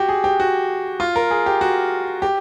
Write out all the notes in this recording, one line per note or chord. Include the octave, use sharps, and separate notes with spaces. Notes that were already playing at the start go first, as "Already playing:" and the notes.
Already playing: F#4 G4
G#4
G4
F#4
F4
A#4
G#4
G4
F#4
G4